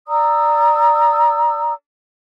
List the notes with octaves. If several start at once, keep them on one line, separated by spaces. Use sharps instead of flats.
D5 A#5 D#6 E6